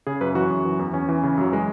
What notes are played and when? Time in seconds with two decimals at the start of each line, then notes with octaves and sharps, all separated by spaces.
0.07 C#3 G#4
0.21 F#2 B4
0.35 E3 F#4
0.51 F#2
0.65 E3
0.79 E2
0.93 E2 C#4
1.09 E3
1.23 C#3
1.38 F#2 F#3
1.52 E3 G#3